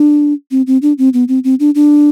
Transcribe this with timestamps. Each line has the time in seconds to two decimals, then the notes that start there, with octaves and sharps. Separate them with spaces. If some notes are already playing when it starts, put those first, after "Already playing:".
Already playing: D4
0.51 C4
0.67 C4
0.82 D4
0.98 C4
1.13 B3
1.28 C4
1.44 C4
1.60 D4
1.75 D4